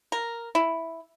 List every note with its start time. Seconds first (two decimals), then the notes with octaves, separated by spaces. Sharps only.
0.12 A#4
0.55 E4